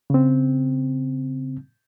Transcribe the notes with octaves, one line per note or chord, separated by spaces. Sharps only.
C#3 C4